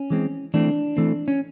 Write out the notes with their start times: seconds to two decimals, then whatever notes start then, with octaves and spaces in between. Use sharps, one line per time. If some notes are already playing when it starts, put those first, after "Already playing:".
Already playing: C#4
0.10 E3 G#3 C4
0.54 E3 A3 C4 D4
0.97 E3 A3 C4
1.28 C#4